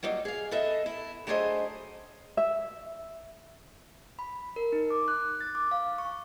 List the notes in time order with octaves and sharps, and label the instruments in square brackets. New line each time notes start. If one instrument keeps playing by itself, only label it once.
[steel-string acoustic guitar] F#3 G3 A#3 D#4
G#4 F5
B3 A4 D#5 E5
E4
F#3 A3 D4 G#4 C5 D#5
[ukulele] E5
[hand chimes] B5
A#4
D#4
D6
F#6
A6
D6
F5
C#6